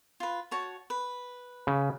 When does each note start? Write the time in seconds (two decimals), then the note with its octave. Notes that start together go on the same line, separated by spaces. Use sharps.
0.20 F4 B4
0.51 F#4 C#5 A5
0.90 B4
1.67 C#3